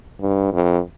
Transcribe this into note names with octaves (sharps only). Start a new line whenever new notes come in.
G2
F2